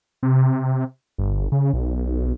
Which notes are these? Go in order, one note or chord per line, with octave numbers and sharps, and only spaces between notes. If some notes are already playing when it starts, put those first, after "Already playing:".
C3
G1
C#3
B1